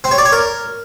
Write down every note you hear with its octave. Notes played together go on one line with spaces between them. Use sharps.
C4
C#5
D5
C#5
A#4